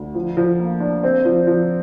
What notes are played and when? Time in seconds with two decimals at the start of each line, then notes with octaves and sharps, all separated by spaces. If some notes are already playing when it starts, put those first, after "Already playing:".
Already playing: D2
0.15 F3
0.37 F3
0.60 A#3
0.80 D4
1.03 C4
1.25 F3
1.47 F3